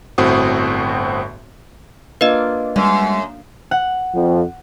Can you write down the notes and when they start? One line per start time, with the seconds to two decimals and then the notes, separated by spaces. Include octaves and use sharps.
0.18 G1 A2 C4 F#4 D#6
2.21 A#3 D4 F4 B4 D#5
2.76 F#2 G3 G#3
3.71 F#5
4.15 F2